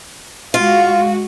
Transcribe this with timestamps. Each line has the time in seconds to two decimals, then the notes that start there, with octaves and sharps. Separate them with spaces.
0.54 G#3 F4 F#4 F5